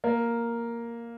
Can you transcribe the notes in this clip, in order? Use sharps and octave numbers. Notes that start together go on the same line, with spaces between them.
A#3